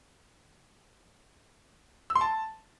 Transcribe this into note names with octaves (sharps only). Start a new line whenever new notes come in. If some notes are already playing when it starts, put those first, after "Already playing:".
E6
C6
A5